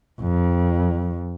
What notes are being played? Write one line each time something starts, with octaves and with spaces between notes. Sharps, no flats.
F2